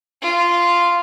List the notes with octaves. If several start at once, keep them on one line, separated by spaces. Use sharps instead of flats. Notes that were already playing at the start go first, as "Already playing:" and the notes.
F4